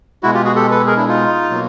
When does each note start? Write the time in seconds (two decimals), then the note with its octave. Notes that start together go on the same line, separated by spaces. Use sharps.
0.23 B2 G#3 E4 F#4
0.34 F4 G4
0.45 F#4 G#4
0.56 G4 A4
0.71 A4 B4
0.87 G#4 A#4
0.97 D4 E4
1.08 D#4 F4
1.51 B2 F#3 A#3